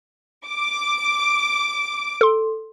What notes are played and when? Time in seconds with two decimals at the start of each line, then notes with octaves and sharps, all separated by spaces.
0.47 D6
2.21 A4 C6